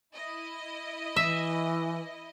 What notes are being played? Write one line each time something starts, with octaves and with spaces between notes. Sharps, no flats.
E4 D#5
E3 E5